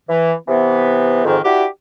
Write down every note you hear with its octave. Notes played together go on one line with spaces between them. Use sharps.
E3
C3 E3 B3
F2 G#2 D#3
D4 E4 F#4 G4